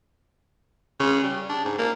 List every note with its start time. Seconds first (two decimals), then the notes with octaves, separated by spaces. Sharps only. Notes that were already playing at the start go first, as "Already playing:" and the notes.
1.00 C#3
1.23 G3
1.49 D4
1.65 G#2
1.79 A#3